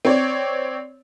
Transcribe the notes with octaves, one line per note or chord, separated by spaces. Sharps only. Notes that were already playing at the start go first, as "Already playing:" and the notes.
C4 C#5 D5